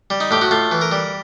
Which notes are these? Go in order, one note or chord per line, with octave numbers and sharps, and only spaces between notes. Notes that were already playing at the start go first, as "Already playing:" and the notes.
G3
D#4
A2 G4
F#4
A2 F4
E3
A#4
G3